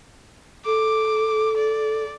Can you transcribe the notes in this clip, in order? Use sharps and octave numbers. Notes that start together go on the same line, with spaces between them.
A4 D6
D5